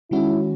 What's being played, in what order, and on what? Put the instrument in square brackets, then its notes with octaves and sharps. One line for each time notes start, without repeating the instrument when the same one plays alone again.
[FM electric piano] D#3 G#3 C#4 F#4 [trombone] E4